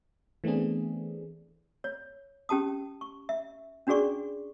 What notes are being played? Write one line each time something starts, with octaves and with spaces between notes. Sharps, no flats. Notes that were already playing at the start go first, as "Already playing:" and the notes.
E3 A3 B3 C4 D4 G#4
C#5
C#4 G4 A5 D#6
C#6
E5
C#4 D4 F#4 G#4 D5 C#6